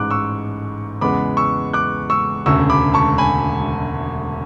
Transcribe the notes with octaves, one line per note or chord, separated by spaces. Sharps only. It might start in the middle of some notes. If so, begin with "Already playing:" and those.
Already playing: A1 G#2 G#3 D6 F#6
C#6 E6
E2 C#3 G#3 B3 B5 D6
C#6 E6
D6 F#6
C#6 E6
E1 D2 C#3 C#6 E6
B5 D6
A5 C#6
G#5 B5